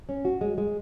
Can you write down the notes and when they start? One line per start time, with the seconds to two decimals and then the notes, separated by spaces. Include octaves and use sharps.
0.09 C#4
0.25 F#4
0.41 G#3
0.58 G#3